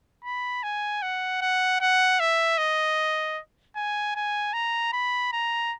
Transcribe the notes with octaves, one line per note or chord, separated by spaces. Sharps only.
B5
G#5
F#5
F#5
F#5
E5
D#5
G#5
G#5
A#5
B5
A#5